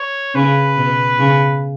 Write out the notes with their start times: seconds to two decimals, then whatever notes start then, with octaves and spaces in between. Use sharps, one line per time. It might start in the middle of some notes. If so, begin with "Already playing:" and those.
Already playing: C#5
0.35 C#3 C#4 B4
0.77 B2 B3
1.19 C#3 C#4